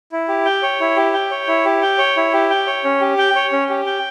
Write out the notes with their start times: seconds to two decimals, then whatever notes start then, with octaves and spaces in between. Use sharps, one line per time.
0.12 E4
0.28 G4
0.45 G5
0.63 C#5
0.80 E4
0.97 G4
1.14 G5
1.31 C#5
1.48 E4
1.65 G4
1.82 G5
1.98 C#5
2.17 E4
2.33 G4
2.50 G5
2.67 C#5
2.84 C#4
3.01 G4
3.18 G5
3.35 C#5
3.52 C#4
3.70 G4
3.86 G5